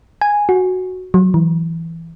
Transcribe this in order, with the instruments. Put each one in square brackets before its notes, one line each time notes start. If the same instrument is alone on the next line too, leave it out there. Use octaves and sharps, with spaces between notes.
[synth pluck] G#5
F#4
F#3
E3